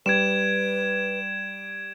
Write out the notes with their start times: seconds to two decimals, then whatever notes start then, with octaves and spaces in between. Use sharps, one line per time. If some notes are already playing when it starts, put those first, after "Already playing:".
0.06 G3 B4 G#6 D7 E7